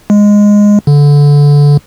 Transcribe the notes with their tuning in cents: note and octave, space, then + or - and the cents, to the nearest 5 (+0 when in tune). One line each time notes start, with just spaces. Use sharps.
G#3 -10
D3 -20